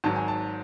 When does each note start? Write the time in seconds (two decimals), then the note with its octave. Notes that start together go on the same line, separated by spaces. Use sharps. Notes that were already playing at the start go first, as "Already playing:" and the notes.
0.04 G#1 G#2 D#3 F#3 A5
0.16 G#5
0.28 A5